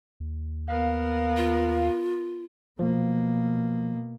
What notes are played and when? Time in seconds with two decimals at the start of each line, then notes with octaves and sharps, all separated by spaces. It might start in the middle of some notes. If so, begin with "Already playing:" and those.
0.20 D#2
0.68 B3 A#4 F5
1.37 F4
2.79 B2 F3 A#3